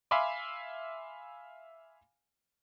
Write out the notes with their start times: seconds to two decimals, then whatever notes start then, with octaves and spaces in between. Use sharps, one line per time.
0.11 E5 F5 G#5 B5 C6 D6